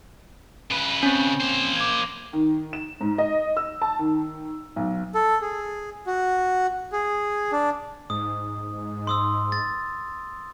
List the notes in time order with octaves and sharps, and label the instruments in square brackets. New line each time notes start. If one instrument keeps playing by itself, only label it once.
[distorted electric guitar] C#3 B4
[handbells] C4 C#4
[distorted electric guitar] A#3 C5
[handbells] D6 G#6
[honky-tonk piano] D#3
E7
G#2
D#5
E6
A5
D#3
B1
[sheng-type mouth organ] A4
G#4
F#4
G#4
D4
[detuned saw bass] G#2 [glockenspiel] D#6
[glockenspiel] C6 D#6 E6
A6